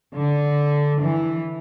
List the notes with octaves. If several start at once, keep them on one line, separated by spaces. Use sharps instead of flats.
D3
E3